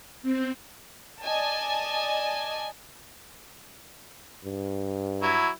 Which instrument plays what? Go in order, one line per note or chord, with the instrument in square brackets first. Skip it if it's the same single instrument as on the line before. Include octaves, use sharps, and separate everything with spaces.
[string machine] C4
[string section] D5 D#5 G#5 A5
[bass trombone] G2
[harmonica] F#3 E4